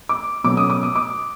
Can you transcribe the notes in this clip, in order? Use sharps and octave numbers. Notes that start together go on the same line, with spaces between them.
D6
B2 F#3 A3 C#4 D6
D#6
D6
D#6
D6